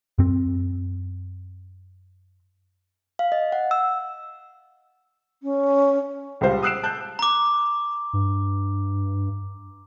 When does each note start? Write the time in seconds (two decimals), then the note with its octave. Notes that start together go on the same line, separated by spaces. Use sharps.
0.18 F#2 C4
3.19 F5
3.32 D#5
3.52 F#5
3.71 E6
5.43 C#4
6.41 C#2 G3 C5 F5
6.63 D#6 E6 F#6 C7 D7 E7
6.83 A5 F#6 G6
7.19 A#5 D6
8.13 G2